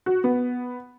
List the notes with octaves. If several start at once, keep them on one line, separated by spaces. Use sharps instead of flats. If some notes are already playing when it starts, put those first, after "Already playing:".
F#4
B3